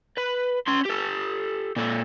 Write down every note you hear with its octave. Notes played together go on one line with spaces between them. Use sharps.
B4
C#4 C6
G4 A4
A#2 A4